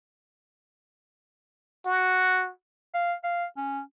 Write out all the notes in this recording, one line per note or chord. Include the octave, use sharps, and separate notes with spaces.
F#4
F5
F5
C#4